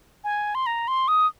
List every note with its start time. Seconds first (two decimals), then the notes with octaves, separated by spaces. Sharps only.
0.24 G#5
0.55 C6
0.66 A#5
0.88 C6
1.08 D#6